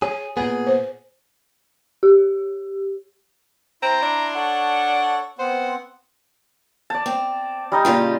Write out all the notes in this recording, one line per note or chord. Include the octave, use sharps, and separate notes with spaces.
G#4 C#5
A#2 B3 G#4
C5
G4
C4 E4 A#5 C6
D4
A4 C#5 F#5 C#6
B3 C4 C5 F#5
D5 A5
C4
G3 D#4 D#5
A#2 C#3 F4